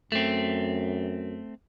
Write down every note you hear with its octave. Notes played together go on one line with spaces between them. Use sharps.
F#2 A3 C4